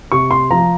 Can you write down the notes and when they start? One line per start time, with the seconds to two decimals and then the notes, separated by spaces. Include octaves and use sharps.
0.12 C3 C#6
0.31 C6
0.50 F3 A#5